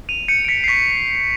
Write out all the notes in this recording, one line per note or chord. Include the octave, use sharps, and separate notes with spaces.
D#7 F7
G6 C#7 D#7
D7
B6 C#7
C7
C#6 B6